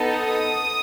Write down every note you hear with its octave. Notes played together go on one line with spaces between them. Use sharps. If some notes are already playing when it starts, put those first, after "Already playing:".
Already playing: B3 D#4 A4
D#6